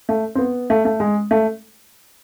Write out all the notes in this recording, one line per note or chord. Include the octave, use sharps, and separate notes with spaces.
A3
C4
B3
A3
A3
G#3
A3